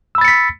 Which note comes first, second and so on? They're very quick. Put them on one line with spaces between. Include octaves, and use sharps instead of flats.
E6 B5 A6 C#7 B6